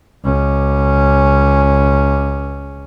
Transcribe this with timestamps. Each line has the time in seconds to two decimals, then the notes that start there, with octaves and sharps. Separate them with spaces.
0.25 C#2 C#4